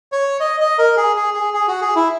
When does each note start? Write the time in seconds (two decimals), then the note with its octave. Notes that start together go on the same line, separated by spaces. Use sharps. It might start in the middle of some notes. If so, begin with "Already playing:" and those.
0.12 C#5
0.40 D#5
0.60 D#5
0.78 A#4
0.97 G#4
1.16 G#4
1.34 G#4
1.54 G#4
1.68 F#4
1.82 G#4
1.96 E4